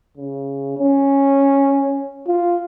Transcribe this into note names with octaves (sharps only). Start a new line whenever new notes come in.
C#3
C#4
F4